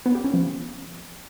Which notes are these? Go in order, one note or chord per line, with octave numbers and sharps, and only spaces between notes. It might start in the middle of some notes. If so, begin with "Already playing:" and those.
B3
G4
C#4
F3